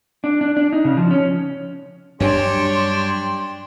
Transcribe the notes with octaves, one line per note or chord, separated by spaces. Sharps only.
D4
D4
D4
D#4
C#3
F3
C#4
G2 F#3 D4 G4 C#5 G5 C6